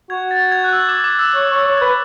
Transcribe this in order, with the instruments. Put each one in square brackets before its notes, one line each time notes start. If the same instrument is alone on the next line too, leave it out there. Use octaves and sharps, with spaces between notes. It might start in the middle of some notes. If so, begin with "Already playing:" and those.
[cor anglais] F#4 [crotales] G#6
[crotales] A6
G#6
F#6
E6
D6
D6
E6
[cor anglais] C#5
[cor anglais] C#5 [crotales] E6
[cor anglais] C#5
[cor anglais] B4 [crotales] G#6